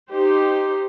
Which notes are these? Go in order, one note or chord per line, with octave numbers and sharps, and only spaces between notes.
D#4 G4 C5